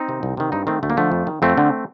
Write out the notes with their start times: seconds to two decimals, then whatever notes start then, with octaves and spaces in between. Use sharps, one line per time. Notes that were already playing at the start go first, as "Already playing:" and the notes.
Already playing: C4 D#4
0.08 C3 D#3
0.23 C2
0.37 C3 D#3
0.52 G2 C4 D#4
0.67 D#3 A3 C4
0.83 D2 A3
0.90 A#3
0.97 D3 F3 A3
1.12 F2
1.27 D#3
1.42 F2 A3 C4
1.57 D3